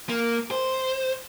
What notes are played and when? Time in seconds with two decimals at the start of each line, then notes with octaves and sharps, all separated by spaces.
0.09 A#3
0.51 C5